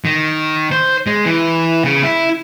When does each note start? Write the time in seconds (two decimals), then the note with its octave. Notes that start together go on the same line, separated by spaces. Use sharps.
0.05 D#3
0.72 C5
1.07 G#3
1.25 E3
1.85 C#3
2.03 E4